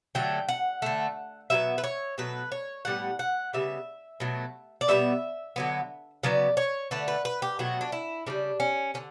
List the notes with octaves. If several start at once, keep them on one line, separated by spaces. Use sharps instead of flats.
D3 F#3 A3 G5
F#5
D3 A3
B2 F#3 B3 E5
B4
C#5
B2 F#3 A3 B4
C#5
A2 G3 B3 F#5
F#5
C#3 G3 B3 E5
B2 F#3 A3
D5
B2 G3 B3 E5
D3 F#3 B3
C#3 F#3 B3 D5
C#5
D3 A3 B4
B4
B4
G4
B2 F#3 A3 F#4
D4
E4
C#3 E3 G3 D4
C#4
D3 C#4